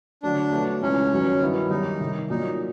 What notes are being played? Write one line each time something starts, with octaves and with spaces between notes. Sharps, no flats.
D3 F#3 A3 D4
B2 F#3 A3
C#2 C#3 E3 A3 C#4
G2 D#3 F#3 B3
G2 D#3 F#3 B3 E4
F#2 D#3 G3 D#4
C3 D#3 G3
A#2 F#3 A#3 D#4